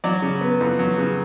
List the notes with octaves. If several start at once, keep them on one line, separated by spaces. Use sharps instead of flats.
F#3 D5
C#3
B3
F2
F#3
C#3